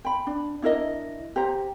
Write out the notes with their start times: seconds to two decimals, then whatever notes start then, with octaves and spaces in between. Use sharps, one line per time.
0.05 G5 B5
0.27 D4
0.62 D4 E4 A#4 D#5
1.36 G4 C5 A#5